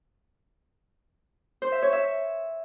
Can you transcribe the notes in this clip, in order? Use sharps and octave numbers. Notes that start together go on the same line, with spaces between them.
C5
E5
C#5
E5